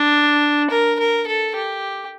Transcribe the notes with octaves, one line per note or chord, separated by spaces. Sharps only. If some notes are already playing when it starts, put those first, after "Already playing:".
Already playing: D4
A#4
A#4
A4
G4